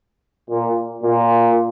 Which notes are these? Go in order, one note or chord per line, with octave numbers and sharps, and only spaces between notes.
A#2
A#2